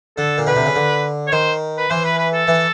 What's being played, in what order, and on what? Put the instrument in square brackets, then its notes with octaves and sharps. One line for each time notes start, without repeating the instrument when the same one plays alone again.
[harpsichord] D3 [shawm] A4
[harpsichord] A#2
[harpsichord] B2 [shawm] B4
[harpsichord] C3
C#3
D3
[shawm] C#5
[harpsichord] D#3 [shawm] C5
[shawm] B4
[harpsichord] E3 [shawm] C5
[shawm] B4
B4
A4
[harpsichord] E3